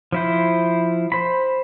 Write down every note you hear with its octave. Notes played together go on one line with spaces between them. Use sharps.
F3 E4 C5
C5 B5